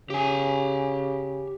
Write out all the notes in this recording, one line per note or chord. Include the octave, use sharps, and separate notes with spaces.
C#3 G4 G#5